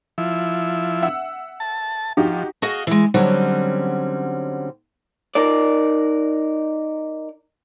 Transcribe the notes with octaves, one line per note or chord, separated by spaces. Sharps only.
F3 E4
E5 F#5 E6
A5
F3 D#4 F#4 G4
F#4 G#4 D#5 F5
E3 G#3
D3 F#3 G3 C4 C#4
D#4 A#4 D5